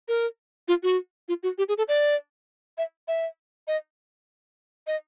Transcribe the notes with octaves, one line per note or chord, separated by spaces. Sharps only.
A#4
F4
F#4
F4
F#4
G4
G#4
A4
D5
E5
E5
D#5
D#5